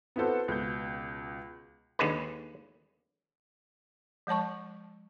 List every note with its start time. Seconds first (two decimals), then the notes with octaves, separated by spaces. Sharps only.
0.16 B3 C4 E4 F#4 A4 C5
0.48 C#2 B2 G6
1.99 D#2 D3 G#3 B4
4.27 F3 G#3 C#5 A5 C#6